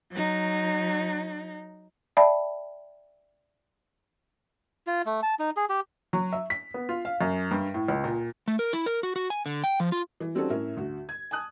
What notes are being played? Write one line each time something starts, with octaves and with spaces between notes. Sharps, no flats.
F#3 D#4
D5 E5 G5 A5 B5
F4
A3
A5
D#4
G#4
G4
F#3
E5
B6
B3
F4
F5
F#2
G2
A2
C#2
A#2
A3
A#4
E4
A#4
F#4
F#4
G#5
D3
G5
F3
F4
E3
G3 C4 C#4 D#4 F#4 A4
A2 C#4 A#4 E5
D2 F#4
G#6
G#5 A5 D#6 F#6